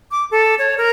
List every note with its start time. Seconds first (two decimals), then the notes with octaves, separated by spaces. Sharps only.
0.11 D6
0.31 A4
0.59 C#5
0.78 A#4